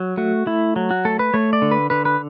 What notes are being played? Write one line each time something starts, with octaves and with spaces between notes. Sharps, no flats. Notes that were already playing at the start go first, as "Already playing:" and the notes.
Already playing: F#3
A3 F#4
A3 E4
F#3
F#4
A3 A4
B4
A3 C#5
D5
D3
B4
D3 B4
B4